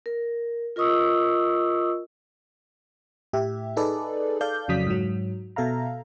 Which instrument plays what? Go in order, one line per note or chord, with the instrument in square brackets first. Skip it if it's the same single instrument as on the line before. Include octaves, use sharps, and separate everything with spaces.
[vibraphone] A#4
F4 A#4 D#5 C#6 D#6 E6
[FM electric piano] A2 G4 E5
D#4 G#4 A4 B4 D5
A4 D5 F5 G6
F2 C#3 F#3 D#6 B6
G#2 F#3
B2 A4 E5 F5 A#5